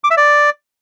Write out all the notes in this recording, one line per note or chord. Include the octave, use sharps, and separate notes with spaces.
D6
E5
D5